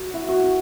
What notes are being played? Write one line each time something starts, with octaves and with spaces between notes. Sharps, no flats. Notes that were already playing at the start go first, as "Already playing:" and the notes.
Already playing: F#4
E4
F#4
F#4